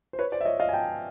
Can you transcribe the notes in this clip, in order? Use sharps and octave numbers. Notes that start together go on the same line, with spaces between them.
C5
B4 C#5
C5 D5
E5
C#5 D#5
D#5 F5
G#5
G5 A5